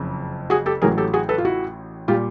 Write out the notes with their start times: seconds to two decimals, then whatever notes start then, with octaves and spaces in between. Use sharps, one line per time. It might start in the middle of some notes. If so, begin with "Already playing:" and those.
Already playing: F#1 F2 C#3
0.50 F#4 G#4
0.66 G4 A4
0.82 A1 A2 F#3 G#4 A#4
0.98 G4 A4
1.14 F#4 G#4
1.29 A4 B4
1.38 F4
1.45 E4 F#4
2.08 A#2 G3 F4 G4